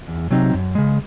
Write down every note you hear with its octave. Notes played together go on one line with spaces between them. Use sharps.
E2
C3 F#3 C4 D#4
F#2
C#3 G#3